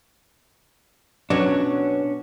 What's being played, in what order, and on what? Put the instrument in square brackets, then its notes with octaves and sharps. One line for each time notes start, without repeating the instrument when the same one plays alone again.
[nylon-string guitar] B2 F#4 C#5 [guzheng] F#3 [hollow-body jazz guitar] C#4 D4